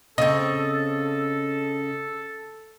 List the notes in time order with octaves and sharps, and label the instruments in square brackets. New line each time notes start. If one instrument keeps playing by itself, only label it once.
[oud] C#3 C4 [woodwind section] A4 [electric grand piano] D#5